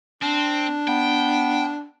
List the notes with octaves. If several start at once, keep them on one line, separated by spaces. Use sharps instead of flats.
C4 D4
B3 G5